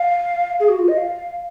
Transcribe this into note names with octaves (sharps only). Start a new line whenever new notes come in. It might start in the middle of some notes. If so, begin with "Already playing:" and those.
Already playing: F5
G#4
F#4
F4
D#5
F5